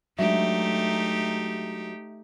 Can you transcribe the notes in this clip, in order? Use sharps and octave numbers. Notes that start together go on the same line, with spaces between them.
F#3 G#3 A3 D4 D#4 G4 E5